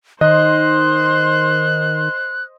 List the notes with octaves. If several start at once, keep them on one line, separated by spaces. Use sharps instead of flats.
D#3 C5 D#5 C6 F#6